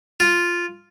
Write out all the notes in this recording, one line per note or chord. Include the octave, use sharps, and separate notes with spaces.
F4